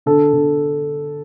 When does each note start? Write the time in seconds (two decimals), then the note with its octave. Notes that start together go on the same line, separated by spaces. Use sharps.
0.06 D3 A4
0.33 D3